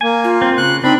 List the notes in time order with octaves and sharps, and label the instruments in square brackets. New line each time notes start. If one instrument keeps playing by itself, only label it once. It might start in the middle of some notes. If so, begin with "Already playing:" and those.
[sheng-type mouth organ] A#3 [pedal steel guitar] G#5
[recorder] F4
[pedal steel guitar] C4
[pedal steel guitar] C#3 [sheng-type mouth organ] F#6
[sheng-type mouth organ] C4 B5 [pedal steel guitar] D4 [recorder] D#4